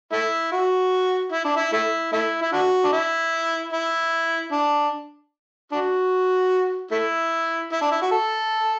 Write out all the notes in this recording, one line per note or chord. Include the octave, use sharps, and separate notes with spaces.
A3 E4
F#4
E4
D4
E4
A3 E4
A3 E4
E4
D4 F#4
D4
E4
E4
D4
D4 F#4
A3 E4
E4
D4
E4
F#4
A4